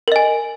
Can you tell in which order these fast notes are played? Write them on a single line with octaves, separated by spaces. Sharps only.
A#4 D#5 G#5